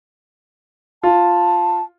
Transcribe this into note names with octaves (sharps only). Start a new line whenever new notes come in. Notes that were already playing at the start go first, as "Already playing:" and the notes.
F4 A5